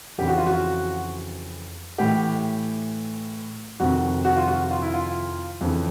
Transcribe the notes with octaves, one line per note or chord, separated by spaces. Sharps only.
F2 C#3 E3 G4
F#4
F4
F#4
A2 E3 G4
F2 C3 D#3 F#4
F#4
F4
F#4
F4
E4
F4
F2 C#3 E3